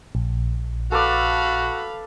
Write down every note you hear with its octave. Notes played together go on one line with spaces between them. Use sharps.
A#1
F#4 A4 B4 D5 F5 B5